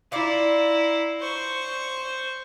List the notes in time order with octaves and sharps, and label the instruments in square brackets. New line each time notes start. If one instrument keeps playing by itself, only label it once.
[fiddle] E4 A#5 [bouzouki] F4 D5
[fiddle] C5 C#6